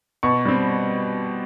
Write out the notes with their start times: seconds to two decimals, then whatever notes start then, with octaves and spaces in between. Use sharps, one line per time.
0.23 B2 C#6
0.45 G3 C4